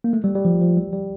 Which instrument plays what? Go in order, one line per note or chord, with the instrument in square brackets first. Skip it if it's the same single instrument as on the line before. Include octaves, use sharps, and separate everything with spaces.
[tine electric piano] A#3
A3
G3
G3
F3
F3
G3
G3